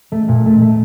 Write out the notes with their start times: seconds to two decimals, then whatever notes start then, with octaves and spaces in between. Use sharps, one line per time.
0.12 A3
0.28 A#2
0.46 A3
0.62 A3